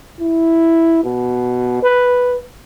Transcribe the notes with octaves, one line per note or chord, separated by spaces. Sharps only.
E4
B2
B4